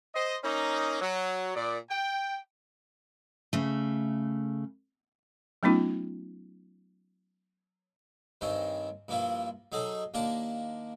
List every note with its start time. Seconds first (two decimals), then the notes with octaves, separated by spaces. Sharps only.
0.14 C5 D#5
0.43 A#3 C#4 D#4
1.01 F#3
1.55 A#2 D5
1.90 G5
3.53 C#3 A3
5.63 F#3 A3 B3 C#4 D#4 F4
8.41 G2 D#3 C4 C#4 G5
9.09 G2 F3 A#3 E4 F4
9.72 F#3 D#4 G#4 A4
10.14 D#2 A#3 D4 A#4 A5